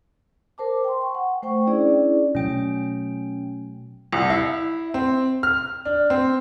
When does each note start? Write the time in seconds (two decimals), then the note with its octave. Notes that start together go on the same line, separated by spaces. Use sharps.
0.58 A#4 C5 A5 D6
0.84 G5 C6
1.02 C#6
1.15 F#5
1.42 A3 C5 G5 C#6
1.67 C#4 D4 E4 G#4 D5
2.35 B2 F#3 A3 C#4 G5
4.12 C2
4.30 E4
4.94 C4
5.43 F6
5.85 D4
6.10 C4